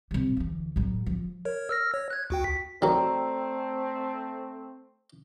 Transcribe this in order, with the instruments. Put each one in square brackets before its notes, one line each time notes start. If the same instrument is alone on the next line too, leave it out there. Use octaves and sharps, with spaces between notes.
[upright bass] C3 G3
D2 E3
A2 F#3
F3
[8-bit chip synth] A#4 C#5
E6 F6 A#6
C#5
F#6 G#6
D2 F#4 G5
B6
[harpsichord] D#3 F#3 [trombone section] A3 C4 [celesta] D5 G5 A#5